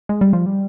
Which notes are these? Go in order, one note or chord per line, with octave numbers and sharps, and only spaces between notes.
G#3
G3
F3
G3